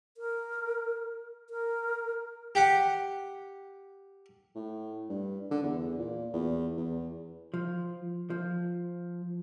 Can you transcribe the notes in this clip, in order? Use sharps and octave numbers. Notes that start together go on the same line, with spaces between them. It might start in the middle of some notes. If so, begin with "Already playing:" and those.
A#4
A#4
G4 F#5
A2
G2
D3
E2
A#2
E2
E2
F3
F3